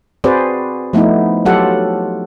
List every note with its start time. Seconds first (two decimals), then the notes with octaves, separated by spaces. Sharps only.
0.24 C4 F#4 G#4 B4 C5 D5
0.93 F3 A3 B3 D#4 E4
1.45 F#3 F4 G4 A4 F#5